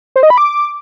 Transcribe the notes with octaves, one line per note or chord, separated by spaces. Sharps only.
C5
D#5
B5
D6